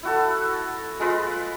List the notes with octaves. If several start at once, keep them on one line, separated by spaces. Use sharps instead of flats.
E4 F#4 A4
G#3 F4 B4 A#5